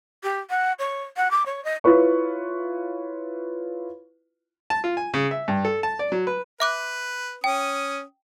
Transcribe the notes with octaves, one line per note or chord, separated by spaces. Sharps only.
G4
F#5
C#5
F#5
D6
C#5
D#5
E4 F4 B4 C#5 C#6
A5
F4
G#5
C#3
E5
G2
A4
A5
D5
F#3
B4
B4 E5 D6 F#6
C#4 G5 D#6